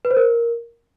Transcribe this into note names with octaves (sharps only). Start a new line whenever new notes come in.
B4
C5
A#4